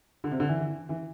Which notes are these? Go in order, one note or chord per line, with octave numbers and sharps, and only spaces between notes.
D3
C3
D3
E3
E3